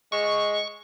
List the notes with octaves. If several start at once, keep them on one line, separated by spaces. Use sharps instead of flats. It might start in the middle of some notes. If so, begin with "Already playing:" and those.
G#3 C#6